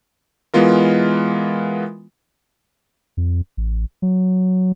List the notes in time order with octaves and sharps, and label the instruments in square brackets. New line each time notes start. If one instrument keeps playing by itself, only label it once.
[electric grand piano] E3 G#3 B3 F4 A#4
[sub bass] F2
A1
F#3